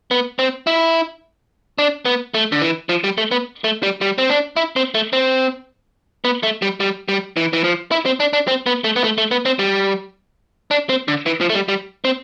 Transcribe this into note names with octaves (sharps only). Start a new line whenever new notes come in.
B3
C4
E4
D4
B3
A3
D3
E3
F3
G3
A3
B3
A3
G3
G3
C4
D4
E4
C4
A3
C4
B3
A3
G3
G3
G3
E3
E3
F3
E4
C4
D4
D4
C4
B3
A3
B3
A3
A3
B3
C4
G3
D4
C4
D3
E3
F3
A3
G3
G3
C4